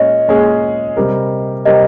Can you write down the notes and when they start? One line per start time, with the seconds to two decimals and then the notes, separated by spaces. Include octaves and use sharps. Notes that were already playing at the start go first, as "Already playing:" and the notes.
Already playing: A#2 G#3 C#4 D#5
0.28 A#2 G#3 C#4 G#4
0.97 C3 G3 C4 G4 A#4
1.65 C3 G3 C4 G4 A#4 D#5